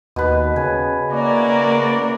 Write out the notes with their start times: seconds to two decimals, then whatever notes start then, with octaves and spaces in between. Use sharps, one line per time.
0.16 D#2 B2 B4
0.56 C#3 G#5
1.12 A#3 E4 F#4 A#4 D5